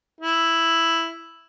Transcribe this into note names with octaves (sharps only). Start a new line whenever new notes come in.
E4